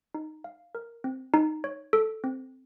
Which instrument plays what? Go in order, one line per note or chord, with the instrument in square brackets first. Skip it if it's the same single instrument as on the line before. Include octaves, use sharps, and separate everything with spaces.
[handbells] D#4
F5
A#4
C4
D#4
C#5
A4
C4